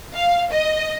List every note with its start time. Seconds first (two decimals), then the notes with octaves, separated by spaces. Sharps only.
0.17 F5
0.51 D#5